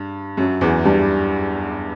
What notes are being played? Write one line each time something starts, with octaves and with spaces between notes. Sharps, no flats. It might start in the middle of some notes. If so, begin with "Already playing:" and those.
Already playing: G2
F#2 F#3
E2 E3
G2 G3